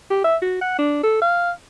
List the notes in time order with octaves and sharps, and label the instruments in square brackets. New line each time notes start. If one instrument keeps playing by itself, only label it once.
[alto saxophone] G4
E5
F#4
F#5
D4
A4
F5